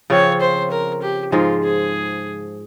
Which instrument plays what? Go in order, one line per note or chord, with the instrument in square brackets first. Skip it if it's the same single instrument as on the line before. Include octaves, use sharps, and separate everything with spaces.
[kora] C#3 F3 C4 [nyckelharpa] C#5
[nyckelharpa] C5
A#4
G4
[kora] G#2 F3 G#3 [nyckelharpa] F4
[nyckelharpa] G#4